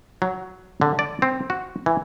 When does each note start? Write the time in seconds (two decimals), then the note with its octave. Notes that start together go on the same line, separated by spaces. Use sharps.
0.22 F#3
0.81 D3
0.99 D5
1.22 C4
1.50 F#4
1.86 E3